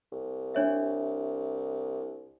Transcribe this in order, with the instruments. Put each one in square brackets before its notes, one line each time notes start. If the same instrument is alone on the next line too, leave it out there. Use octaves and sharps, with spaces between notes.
[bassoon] C2
[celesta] D4 C#5 E5